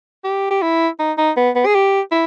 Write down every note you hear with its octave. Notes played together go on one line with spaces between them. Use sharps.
G4
G4
E4
D#4
D#4
B3
B3
G#4
G4
E4